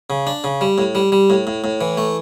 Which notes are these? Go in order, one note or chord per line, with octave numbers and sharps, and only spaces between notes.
C#3
D4
C#3
G3
A2
G3
G3
A2
A2
A2
E3
A3